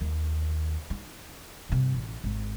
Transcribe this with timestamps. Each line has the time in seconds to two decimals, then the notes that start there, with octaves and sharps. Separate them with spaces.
0.01 D#2
0.90 D#4
1.69 G2 C3
1.95 A1
2.24 G#1